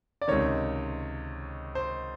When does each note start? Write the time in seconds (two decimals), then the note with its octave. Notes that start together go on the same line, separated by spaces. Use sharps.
0.21 D5
0.28 C#2 C3 D#3 C#5
1.75 C5